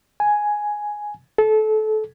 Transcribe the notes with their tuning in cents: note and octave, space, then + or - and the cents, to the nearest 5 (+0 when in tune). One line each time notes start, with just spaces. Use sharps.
G#5 +5
A4 -25